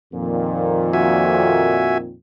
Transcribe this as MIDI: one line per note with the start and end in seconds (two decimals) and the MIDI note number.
0.13 2.14 41
0.13 2.14 46
0.13 2.14 51
0.93 1.98 66
0.93 1.98 76
0.93 1.98 80